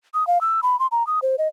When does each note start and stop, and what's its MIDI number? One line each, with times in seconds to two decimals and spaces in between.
0.14 0.26 87
0.27 0.41 77
0.41 0.61 88
0.63 0.79 83
0.79 0.87 84
0.92 1.06 82
1.07 1.19 87
1.22 1.36 72
1.38 1.48 75